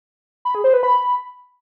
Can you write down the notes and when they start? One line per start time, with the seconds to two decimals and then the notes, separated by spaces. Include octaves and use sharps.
0.45 B5
0.55 G#4
0.64 C5
0.74 B4
0.83 B5